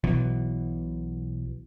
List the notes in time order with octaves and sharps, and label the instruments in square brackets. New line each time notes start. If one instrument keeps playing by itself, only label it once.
[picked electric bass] B1 B2 E3 F#3